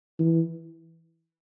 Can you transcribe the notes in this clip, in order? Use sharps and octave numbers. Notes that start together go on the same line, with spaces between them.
E3